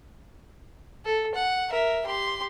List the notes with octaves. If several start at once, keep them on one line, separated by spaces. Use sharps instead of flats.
A4
F#5
A#4 E5
G4 C6